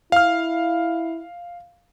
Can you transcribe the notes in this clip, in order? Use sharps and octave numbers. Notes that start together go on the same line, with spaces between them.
E4 F5 F6